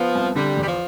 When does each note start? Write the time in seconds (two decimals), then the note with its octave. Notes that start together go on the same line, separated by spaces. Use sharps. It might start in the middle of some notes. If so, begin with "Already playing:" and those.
Already playing: F3 B3
0.15 C2
0.35 D3 G3
0.57 E2
0.62 G3
0.68 F3